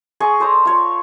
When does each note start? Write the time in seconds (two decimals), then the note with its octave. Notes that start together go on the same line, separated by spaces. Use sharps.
0.20 G#4 D#5 C#6
0.40 A4 C5 D5 A#5
0.65 F4 C#5 C#6